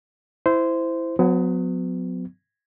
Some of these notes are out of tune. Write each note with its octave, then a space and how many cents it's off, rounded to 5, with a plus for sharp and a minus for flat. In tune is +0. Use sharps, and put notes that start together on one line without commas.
E4 +0 C5 -15
F#3 -25 B3 +30